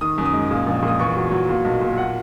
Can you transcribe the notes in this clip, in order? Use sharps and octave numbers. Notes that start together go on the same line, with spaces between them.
D#3 D#6
F#2
D#6
G#3
A#2
A#1
A#2
D#6
E2 C#6
F#3
F#3
A#2
B1
A#2
F#5